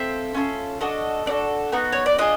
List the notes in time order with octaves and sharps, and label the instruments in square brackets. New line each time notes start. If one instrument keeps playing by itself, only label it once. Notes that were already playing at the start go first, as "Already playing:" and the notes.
Already playing: [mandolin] C4 F4 A4 E5
C#4 F4 A4
D4 F#4 A4 D#5
D4 F#4 A4 D5
B3 D#4 F#4
C#5
D5
D4 F4 G#4 D#5